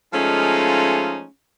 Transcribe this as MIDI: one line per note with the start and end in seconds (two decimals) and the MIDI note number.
0.14 1.26 53
0.14 1.26 56
0.14 1.26 57
0.14 1.26 61
0.14 1.26 63
0.14 1.26 65